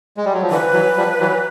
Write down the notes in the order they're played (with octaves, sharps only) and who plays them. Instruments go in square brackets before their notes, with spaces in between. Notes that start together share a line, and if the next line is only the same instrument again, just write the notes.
[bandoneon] G#3
G3
F#3
F3
[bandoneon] D3 E3 [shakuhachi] B4
[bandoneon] E3 F#3
F3 G3
E3 F#3